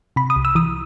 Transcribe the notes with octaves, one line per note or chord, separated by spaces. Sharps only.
C3 B5
D#6
C2
E6
E3 D#6